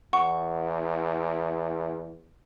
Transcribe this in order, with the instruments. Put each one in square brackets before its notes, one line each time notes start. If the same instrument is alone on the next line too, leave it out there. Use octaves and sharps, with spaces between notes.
[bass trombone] E2 [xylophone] F#5 C#6